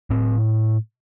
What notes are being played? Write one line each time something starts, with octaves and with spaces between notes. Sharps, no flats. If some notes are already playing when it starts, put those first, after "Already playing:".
A2 C4